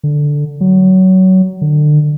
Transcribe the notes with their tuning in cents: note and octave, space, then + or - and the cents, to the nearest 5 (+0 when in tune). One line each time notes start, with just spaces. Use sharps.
D3 +0
F#3 +20
D3 +30